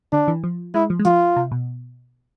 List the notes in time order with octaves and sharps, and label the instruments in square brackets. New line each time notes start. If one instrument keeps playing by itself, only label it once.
[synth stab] D3 [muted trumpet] D4
[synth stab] E3
F3
[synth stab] G#3 [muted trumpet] E4
[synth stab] F3
G#3
[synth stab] F3 [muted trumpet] F4
[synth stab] C3
B2